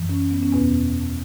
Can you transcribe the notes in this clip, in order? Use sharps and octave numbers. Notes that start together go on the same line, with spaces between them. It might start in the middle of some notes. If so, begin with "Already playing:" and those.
Already playing: F#2 E3
C#4
B3
C#4
E2 B2 B3